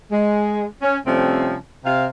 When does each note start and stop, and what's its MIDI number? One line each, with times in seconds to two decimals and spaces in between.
0.11 0.65 56
0.82 0.97 61
1.07 1.55 48
1.07 1.55 53
1.07 1.55 55
1.07 1.55 57
1.07 1.55 60
1.07 1.55 61
1.84 2.05 48
1.84 2.05 77